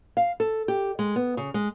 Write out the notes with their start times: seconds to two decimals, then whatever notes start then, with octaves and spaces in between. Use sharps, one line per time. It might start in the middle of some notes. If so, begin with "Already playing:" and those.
0.17 F5
0.40 A4
0.68 G4
0.99 G#3
1.16 B3
1.37 C#3
1.54 G#3